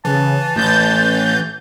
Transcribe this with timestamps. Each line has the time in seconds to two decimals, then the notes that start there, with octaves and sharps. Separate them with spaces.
0.05 C#3 E3 A5
0.56 A1 G6 A6